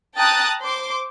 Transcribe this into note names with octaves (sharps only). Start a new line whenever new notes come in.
G5 A5 A#5 D#6 F#6 A6
C5 C6 D6